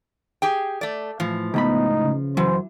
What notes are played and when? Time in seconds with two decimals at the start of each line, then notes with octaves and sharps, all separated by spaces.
0.42 G4 G#4 G5
0.81 A3 D5
1.20 A2 E3 F3
1.54 C#2 A2 B3 D#4 B5
2.03 C#3
2.37 F#2 E3 C5